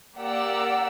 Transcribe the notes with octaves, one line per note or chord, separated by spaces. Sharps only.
A#3 G4 A#4 D5 F#5 E6